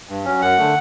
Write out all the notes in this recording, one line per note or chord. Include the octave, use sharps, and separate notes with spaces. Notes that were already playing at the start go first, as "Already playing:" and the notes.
G2
F#3 C#4
F#2 F#5
D3 A3